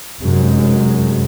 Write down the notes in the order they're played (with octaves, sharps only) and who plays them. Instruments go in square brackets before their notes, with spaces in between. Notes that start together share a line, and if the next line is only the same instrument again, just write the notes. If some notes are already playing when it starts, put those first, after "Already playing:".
[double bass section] F1 F#2 G#3